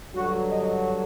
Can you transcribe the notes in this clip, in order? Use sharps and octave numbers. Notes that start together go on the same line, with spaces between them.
G2 D3 F#3 F#4
D#5